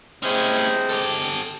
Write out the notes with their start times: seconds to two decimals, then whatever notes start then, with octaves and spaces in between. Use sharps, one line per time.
0.22 C3 G#3 C4 C#4 E4
0.90 G4 A4